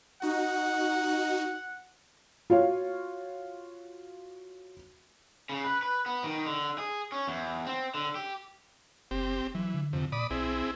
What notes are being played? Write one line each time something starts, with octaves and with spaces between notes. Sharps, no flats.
D#4 F#4 F#5
F4 F#4 C#5 F5
C#3
B4
B4
B3
D#3
D3
G#4
C#4
E2
C4
D3
G4
F#1 C4 G4
E3 F#3
D3
F2 C3
A#2 D5 B5 D#6
B1 C4 E4 G#4